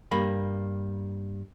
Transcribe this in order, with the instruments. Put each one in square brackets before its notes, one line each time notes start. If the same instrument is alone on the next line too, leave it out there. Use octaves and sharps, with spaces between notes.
[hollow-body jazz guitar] G2 G3 A#3 B5